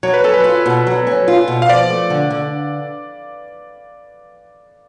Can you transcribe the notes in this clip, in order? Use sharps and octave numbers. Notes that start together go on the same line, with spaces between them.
F#3 C#5
B4
C#4 A4
B4
F4
B2
F#3
C#4
F4
B2
F5
F3 D5
A3
D3
D3